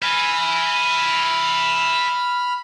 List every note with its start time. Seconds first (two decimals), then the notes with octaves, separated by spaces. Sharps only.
0.02 E5 G#5 B5 F6